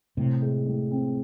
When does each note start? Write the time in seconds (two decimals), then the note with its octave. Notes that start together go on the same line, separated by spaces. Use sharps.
0.17 A2 C3
0.42 G#3
0.67 A2
0.91 C4